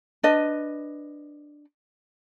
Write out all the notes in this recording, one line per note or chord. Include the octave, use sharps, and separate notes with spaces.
D4 B4 D#5